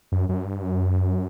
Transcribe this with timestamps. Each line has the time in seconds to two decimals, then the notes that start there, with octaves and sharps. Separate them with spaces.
0.12 F#2
0.29 F#2
0.45 G2
0.63 F#2